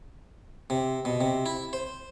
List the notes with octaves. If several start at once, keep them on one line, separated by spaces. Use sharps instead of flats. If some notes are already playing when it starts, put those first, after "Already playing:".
C3
B2
C3
E4
C5